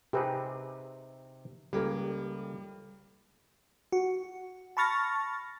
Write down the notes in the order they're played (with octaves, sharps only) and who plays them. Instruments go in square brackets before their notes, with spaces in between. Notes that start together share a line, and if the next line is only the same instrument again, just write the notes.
[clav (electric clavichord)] C3 C4 D#4 [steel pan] G4 G#4 B4
[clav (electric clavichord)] C#2 A#3 [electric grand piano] G3 [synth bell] G4 A4
[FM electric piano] F#4
A5 B5 C#6 F6 A6 A#6